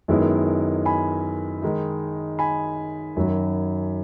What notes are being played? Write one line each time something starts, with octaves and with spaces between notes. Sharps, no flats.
F#2 D#3 G#3 B3 E4
G#5 B5
D#3 G#3 D#4
G#5 B5
F#2 D#3 F#3